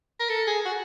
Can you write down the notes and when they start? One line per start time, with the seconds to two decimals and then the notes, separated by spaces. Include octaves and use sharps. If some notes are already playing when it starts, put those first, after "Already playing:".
0.20 A#4
0.29 A4
0.47 G#4
0.65 F#4